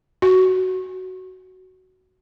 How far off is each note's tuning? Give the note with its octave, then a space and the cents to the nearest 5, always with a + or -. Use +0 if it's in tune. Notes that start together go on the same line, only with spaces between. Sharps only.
F#4 +10